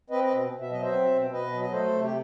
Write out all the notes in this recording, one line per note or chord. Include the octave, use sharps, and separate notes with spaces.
C4 B4 D#5
B4 D#5
B2
B2
E5
F#3 D#5
C5 E5
C4
B2
B2 B4 D#5
F#3
D#5
A3 A4 C5
C3
G4